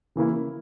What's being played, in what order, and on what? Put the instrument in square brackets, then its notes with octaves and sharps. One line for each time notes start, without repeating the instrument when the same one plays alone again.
[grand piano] C#3 E3 A#3 E4